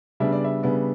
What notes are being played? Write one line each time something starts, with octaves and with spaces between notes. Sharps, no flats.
C#3 G3 B3 D4 E5
D5
E5
C#3 G3 B3 D4